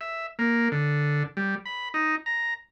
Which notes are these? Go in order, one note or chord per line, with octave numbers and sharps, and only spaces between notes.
E5
A#3
D3
G3
B5
D#4
A#5